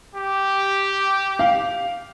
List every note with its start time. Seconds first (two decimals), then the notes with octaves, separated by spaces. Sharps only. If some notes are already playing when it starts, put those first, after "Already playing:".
0.15 G4
1.39 F5